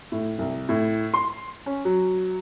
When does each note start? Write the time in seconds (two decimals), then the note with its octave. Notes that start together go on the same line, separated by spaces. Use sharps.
0.12 A2
0.39 C2
0.69 A2
1.14 C6
1.66 C#4
1.85 F#3